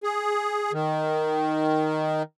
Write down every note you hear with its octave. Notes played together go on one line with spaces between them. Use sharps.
G#4
D#3